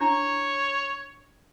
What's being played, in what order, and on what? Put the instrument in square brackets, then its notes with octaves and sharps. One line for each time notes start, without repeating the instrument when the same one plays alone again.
[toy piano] D4 E4 A#5 [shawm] C#5